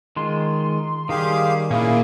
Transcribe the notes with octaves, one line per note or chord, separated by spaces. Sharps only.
D#3 G#3 F4 C6
D#3 G3 G4 G#4 F5
A#2 A#3 C#4 E4 F4 G#4 F5